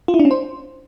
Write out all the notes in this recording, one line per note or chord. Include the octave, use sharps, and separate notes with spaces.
F4
E4
D4
C#4
C5